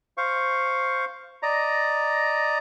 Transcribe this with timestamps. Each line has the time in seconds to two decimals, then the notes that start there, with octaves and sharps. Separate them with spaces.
0.17 C5 F5 C#6
1.43 D5 D#5 A#5